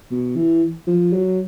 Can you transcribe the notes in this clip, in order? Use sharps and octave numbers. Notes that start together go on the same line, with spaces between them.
B2
E3
F3
F#3